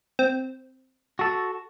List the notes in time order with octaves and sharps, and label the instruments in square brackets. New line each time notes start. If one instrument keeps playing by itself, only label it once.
[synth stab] C4
[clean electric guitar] F#4 A4